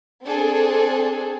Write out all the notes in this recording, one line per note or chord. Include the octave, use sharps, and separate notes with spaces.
C4 D4 G#4 A4